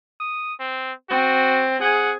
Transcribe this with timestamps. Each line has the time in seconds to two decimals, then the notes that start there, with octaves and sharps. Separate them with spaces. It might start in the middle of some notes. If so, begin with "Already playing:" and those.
0.20 D#6
0.60 C4
1.10 C4 F#4
1.81 G#4 F#5